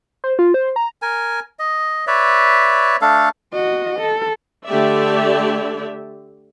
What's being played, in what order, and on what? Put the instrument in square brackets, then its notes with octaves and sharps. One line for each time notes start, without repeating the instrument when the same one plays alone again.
[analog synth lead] C5
F4
C5
A#5
[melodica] A#4 G#5
D#5
B4 C#5 D5 E5
A3 D4 A4 F5
[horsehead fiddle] F#4 D#5
A4
[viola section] D3 A3 G4 D5 E5